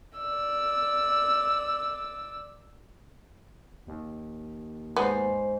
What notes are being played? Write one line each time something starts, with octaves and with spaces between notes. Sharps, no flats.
D5 E6
D#2
G#2 B3 C5